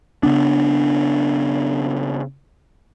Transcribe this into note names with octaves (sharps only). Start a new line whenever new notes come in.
C#3 B3 D4